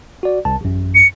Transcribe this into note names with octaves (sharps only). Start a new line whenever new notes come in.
F#4 D5
C2 A5
A1 F#2
C#7